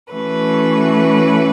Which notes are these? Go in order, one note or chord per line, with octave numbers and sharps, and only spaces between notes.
E3 A3 C#4 F#4 B4